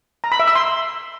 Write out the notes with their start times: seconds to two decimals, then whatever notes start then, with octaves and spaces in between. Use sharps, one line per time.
0.24 A#5
0.32 B5
0.40 E5
0.47 E6
0.55 C6